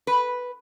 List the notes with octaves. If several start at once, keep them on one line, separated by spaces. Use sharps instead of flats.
B4